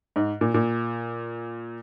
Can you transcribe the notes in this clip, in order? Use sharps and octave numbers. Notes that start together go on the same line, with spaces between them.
G#2
A#2
A#2